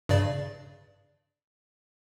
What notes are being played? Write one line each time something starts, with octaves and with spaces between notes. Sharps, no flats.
G2 C#3 D5